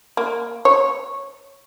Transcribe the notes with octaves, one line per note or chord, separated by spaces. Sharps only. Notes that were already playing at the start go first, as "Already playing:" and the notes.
A#3
C#5